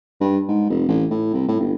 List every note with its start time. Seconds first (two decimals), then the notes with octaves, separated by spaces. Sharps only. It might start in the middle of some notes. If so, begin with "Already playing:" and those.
0.21 G2
0.48 G#2
0.70 F1
0.88 A1
1.11 A2
1.34 C2
1.48 A2
1.60 G1